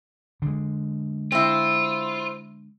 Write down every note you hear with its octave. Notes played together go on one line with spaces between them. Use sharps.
D3 G#3
C4 E4 F4